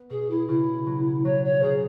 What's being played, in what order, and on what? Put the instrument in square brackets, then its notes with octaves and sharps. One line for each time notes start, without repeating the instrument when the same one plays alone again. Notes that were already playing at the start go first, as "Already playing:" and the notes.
Already playing: [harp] B3
[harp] B2 [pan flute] G#4
[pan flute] E4
[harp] C#3 [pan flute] E4
[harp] F#3
[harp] F#3 [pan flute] C#5
[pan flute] C#5
[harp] C#3 [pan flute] G#4